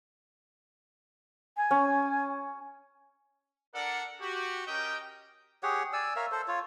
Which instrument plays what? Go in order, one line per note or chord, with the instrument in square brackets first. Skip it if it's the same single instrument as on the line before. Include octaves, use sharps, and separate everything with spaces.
[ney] G#5
[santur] C#4
[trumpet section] D4 A4 A#4 D5 F#5
F#4 G4
C#4 G4 A#4 D#5 G5
[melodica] G4 G#4 C#5 F#5
D5 G#5 E6
A#4 C#5 E5 F5
A4 C5
F4 C#5